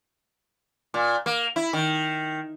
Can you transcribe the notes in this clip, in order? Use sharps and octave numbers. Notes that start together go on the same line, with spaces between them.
A#2
A#3
E4
D#3